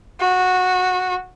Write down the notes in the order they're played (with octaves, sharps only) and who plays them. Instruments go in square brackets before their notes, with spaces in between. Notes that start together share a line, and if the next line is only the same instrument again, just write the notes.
[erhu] F#4